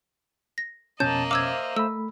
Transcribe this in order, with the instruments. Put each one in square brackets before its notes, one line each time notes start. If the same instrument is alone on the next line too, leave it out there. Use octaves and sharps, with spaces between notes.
[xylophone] A#6
[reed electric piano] F2 B2 C#4 [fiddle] A#3 D#5 [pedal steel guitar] A5 [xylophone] G6
[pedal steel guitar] C5 E5 F5 [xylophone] D6 E6 G#6
[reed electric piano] A3 B5 [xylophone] E6